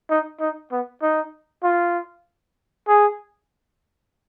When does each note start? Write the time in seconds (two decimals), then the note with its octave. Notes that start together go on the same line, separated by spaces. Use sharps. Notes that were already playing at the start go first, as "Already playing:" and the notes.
0.10 D#4
0.40 D#4
0.72 B3
1.02 D#4
1.64 F4
2.88 G#4